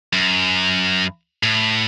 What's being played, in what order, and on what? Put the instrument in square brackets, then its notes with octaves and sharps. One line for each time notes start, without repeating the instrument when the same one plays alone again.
[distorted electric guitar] F#2
A2